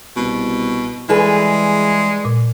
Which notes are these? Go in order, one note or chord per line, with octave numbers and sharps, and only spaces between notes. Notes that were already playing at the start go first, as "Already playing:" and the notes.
C2 B2
E3 G3 G#3 G#4 B4
A#2